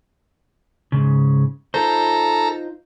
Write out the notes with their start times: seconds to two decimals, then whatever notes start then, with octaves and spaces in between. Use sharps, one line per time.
0.92 G#2 C#3
1.74 D#4 F4 A4 C5 A#5